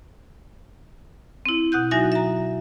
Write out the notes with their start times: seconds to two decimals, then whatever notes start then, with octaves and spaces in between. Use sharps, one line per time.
1.46 C4 E4
1.72 B2 F#5 F#6 G6
1.91 F#3 D#4 F#4 E5 G#5 A#6
2.12 E5 A#5